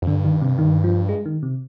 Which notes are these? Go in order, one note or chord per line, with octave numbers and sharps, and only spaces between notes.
F2
G2 D3
D#3
C3
D#3
F3
G#3
D#3
C3